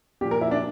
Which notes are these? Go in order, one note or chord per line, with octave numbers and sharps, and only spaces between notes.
A#2 F3 G4
A#4
E4
D4